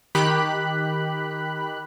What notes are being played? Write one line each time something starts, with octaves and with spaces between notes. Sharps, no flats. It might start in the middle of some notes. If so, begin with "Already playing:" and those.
D#3 G4 B5 F#6